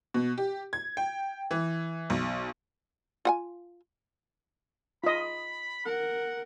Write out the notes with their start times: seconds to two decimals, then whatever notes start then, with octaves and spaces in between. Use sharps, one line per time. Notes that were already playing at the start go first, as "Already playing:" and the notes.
0.14 B2
0.38 G4
0.73 G#6
0.97 G5
1.51 E3
2.10 B1
3.25 F4 F#5 G#5
5.04 F4 D#5 B5
5.86 A#4 F#5